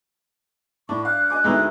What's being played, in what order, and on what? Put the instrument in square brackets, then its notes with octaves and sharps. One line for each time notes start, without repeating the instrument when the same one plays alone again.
[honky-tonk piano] A2 [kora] D4 [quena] C#6
[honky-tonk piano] F5 [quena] F#6
[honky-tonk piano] D#5 G#5 D6
[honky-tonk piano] D2 B3 [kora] G#3 D#4 E4